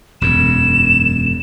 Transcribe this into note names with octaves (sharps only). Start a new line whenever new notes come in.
E1 F#2 E7